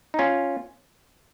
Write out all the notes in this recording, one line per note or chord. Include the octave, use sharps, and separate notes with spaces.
D#4
C#4 F4